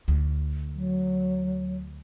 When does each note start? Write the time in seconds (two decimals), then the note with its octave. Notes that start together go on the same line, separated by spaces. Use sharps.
0.08 D2
0.75 F#3